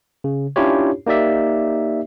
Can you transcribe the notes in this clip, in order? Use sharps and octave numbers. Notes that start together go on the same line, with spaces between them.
C#3
C#4 D4 E4 F4 G4 C#5
A#3 D#4 G4 D5 E5